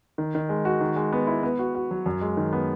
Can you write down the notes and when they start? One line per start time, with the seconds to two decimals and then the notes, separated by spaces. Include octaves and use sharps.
0.18 D#3
0.35 D#3
0.49 G#3
0.65 F#4
0.81 D#3
0.96 G#3
1.12 B3
1.27 E4
1.43 B3
1.59 F#4
1.75 F#4
1.91 F#3
2.06 F#2
2.21 G#3
2.37 D#3
2.53 B3